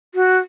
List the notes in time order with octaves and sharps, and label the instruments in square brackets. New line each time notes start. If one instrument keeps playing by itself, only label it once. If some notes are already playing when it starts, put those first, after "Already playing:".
[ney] F#4